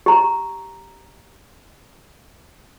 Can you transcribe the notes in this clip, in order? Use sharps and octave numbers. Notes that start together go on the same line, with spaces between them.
G4 A#5